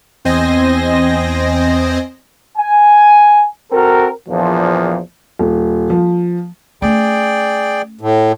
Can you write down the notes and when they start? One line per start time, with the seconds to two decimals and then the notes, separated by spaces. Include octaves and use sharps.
0.25 E2 C4 C5 D#5 G#5 A#6
2.58 G#5
3.72 C4 F#4 A4 A#4
4.28 A#1 E2 A#2 F3
5.39 D#1
5.90 F3
6.82 A3 C#4 G#4 D5 G5
8.01 A2